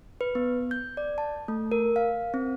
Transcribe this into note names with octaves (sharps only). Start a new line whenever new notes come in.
B4
B3
G6
D5
A5
A3
A#4
F5
C4